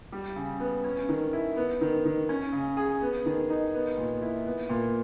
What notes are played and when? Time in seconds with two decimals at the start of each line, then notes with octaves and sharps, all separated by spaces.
0.12 G3
0.36 C#3
0.60 B3
0.84 C#4
1.09 D#3
1.33 E4
1.56 B3
1.81 D#3
2.05 D#3
2.29 C#4
2.52 C#3
2.77 G#4
3.02 B3
3.26 D#3
3.50 D#4
3.74 B3
3.97 A#2
4.22 E4
4.45 B3
4.69 A#2